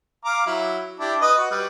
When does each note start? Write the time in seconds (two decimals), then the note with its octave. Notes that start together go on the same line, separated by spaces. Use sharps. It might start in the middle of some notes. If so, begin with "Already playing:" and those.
0.25 F5 A#5 D6
0.46 F#3 E4
0.99 D4 E4 G4
1.21 B4 D#5 D#6
1.38 F#4
1.51 G3 B4